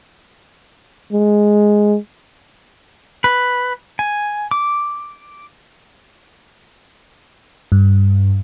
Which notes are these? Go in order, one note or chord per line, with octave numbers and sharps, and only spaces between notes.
G#3
B4
G#5
D6
G2